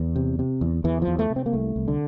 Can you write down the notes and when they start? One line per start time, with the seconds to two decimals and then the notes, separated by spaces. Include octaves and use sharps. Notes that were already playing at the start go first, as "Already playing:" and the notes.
Already playing: E2
0.16 C3
0.39 C3
0.61 E2
0.84 E2 E3
1.02 F3
1.07 E2
1.19 A3
1.30 C3
1.36 C4
1.46 A#3
1.53 C2 A3
1.76 C2
1.88 D3